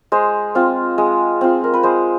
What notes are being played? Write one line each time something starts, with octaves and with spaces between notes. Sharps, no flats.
G#3 C5
C4 F4
G#3
C4 F4
A#4
B4
G#3 C5